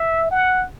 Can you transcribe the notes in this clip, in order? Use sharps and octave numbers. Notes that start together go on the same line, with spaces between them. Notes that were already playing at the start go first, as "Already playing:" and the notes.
Already playing: E5
F#5